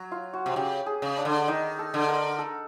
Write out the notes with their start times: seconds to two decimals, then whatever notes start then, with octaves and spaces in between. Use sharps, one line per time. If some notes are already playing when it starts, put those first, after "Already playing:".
Already playing: F#3
0.12 F4
0.33 F#4
0.46 C3
0.56 C#3 G4
0.86 G#4
1.02 C#3
1.18 D4
1.25 D3
1.48 D#3 D#4
1.79 A4
1.94 D3
2.09 A#4
2.39 A4